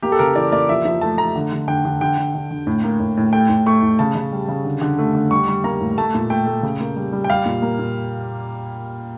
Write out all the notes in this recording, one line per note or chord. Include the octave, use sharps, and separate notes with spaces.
A#3 G4
A4
C#3 A#4
E3 D5
A#3 D5
F3 E5
F3 E5
A3 A5
A3 A#5
D3
D3
D3 G5
D3
D3 G5
D3
D3
D3
A2
A#3
A2
A2
A3 G5
A2
A3 C#6
A2
C#3 A5
C#3
G3
C#3
D3
D3
A3
D3
G3 C#6
G3
A#3 A#5
A2
A3 A5
A#2
A3 G5
A3
C#3
A#3
G3
G3
G5
G3 F5
A#2
A#3
A#2